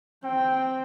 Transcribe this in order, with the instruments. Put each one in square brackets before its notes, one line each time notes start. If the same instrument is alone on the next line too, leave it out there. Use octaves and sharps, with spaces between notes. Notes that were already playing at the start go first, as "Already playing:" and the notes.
[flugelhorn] C4 [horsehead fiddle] G5